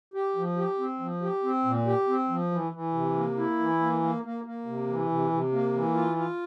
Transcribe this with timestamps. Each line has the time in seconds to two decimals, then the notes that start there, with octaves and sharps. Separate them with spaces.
0.14 G4
0.36 F3
0.56 G4
0.78 C4
1.00 F3
1.21 G4
1.43 C4
1.65 A#2
1.86 G4
2.07 C4
2.29 F3
2.51 E3
2.72 E3
2.93 C3
3.15 A#3
3.37 E4
3.59 E3
3.79 A#3
4.01 A#3
4.23 A#3
4.44 A#3
4.66 C3
4.87 E3
5.09 C3
5.31 C3
5.52 A#3
5.73 E3
5.94 F4
6.17 F4